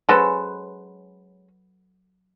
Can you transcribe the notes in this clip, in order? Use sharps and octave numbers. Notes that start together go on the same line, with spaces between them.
F#3 G#3 C#4 A4 B4 C5